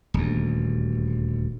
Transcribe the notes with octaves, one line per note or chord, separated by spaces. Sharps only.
D#1 D2